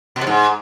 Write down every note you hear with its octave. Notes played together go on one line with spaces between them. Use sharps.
B2
C3
G#2